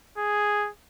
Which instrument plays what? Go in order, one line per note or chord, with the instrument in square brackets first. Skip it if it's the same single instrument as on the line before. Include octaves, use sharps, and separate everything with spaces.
[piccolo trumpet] G#4